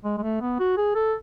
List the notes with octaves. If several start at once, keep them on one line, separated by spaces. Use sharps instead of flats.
G#3
G#3
A3
B3
F#4
G#4
A4